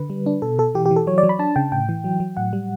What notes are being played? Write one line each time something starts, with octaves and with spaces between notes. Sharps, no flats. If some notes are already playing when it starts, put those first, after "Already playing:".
Already playing: D3 B4
G3
D4
B2 A4
B2 A4
E3 G4
G4
E3
A4
F#3 C#5
D5
F#3
B5
D4 A5
C#3 G5
A2 G5
E3
F#3
F#3
A2 F#5
G3